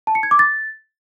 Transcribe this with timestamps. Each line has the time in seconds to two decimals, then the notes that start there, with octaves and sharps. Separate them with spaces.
0.07 A5
0.15 C#7
0.23 G#6
0.31 D6
0.39 A6